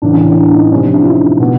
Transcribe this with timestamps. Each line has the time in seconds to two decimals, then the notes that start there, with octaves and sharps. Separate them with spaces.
0.02 A2 E3 D4
0.11 C#4
0.28 D4
0.37 C#4
0.45 D4
0.54 C#4 D#4
0.62 D4
0.72 C3 F3 C#4
0.82 D4
0.94 D4 E4
1.06 D#4 F4
1.40 B2